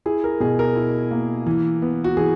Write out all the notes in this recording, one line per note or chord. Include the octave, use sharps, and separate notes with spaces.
E4 G#4
A#4
B2 G#4
A#4
E4
A#3
E3
B3
F#4
E3 G#4